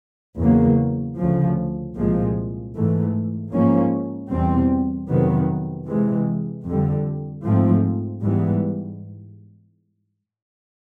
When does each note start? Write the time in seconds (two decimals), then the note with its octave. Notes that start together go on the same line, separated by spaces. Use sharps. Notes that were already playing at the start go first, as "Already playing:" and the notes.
0.37 E2 C#3 F#3 A#3
1.17 D2 C#3 F3
1.95 C2 A#2 F3 G#3
2.74 G#2 E3 A3
3.52 G#2 F3 A#3 C#4
4.31 E2 B2 G3 C4
5.08 F2 C3 D#3 F#3 B3
5.86 C3 E3 G#3
6.65 F2 D3 G3
7.43 G#2 F3 A3 C4
8.23 G#2 E3 G3 B3